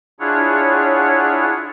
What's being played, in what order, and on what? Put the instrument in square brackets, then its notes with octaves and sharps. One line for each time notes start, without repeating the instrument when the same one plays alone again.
[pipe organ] D4 E4 F4 G#4 C#5 F#5